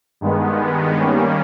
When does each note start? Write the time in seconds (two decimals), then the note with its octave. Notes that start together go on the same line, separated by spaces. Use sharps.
0.21 G2 D#3 G#3 B3
0.98 D#3 G3 A#3 C#4